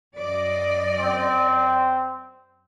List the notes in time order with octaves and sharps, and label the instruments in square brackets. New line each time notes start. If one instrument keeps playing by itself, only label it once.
[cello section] F#2 D5 D#5
[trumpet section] C4